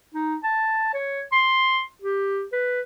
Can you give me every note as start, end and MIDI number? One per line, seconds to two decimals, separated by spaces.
0.14 0.35 63
0.44 0.91 81
0.94 1.21 73
1.32 1.82 84
2.02 2.44 67
2.53 2.81 71